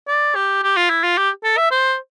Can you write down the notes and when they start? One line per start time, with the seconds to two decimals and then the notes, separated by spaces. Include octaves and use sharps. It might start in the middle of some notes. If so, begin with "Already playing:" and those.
0.08 D5
0.35 G4
0.63 G4
0.77 F4
0.90 E4
1.04 F4
1.18 G4
1.44 A4
1.57 E5
1.71 C5